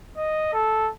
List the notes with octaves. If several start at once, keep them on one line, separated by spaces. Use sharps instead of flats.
D#5
A4